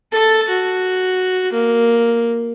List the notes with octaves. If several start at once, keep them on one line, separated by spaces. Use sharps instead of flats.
A4 A5
F#4
A#3